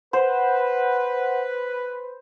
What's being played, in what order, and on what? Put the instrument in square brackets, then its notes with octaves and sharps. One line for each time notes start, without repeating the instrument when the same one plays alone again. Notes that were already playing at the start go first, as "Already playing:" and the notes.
[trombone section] B4 [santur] C5 [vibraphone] F#5